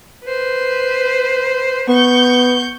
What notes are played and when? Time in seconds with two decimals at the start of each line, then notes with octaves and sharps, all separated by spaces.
0.25 B4 C5
1.88 B3 C#6 G6